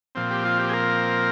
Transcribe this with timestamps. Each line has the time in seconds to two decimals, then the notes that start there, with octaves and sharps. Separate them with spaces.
0.15 A#2 F3 C4
0.31 G4
0.45 F4
0.59 G4
0.69 G#4
0.73 A#4